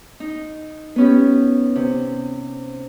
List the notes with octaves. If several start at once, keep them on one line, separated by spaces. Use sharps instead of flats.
D#4
B3 C#4 G4
C3